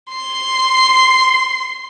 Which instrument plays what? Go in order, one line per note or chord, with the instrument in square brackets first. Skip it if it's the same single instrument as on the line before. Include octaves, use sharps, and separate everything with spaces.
[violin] C6 C7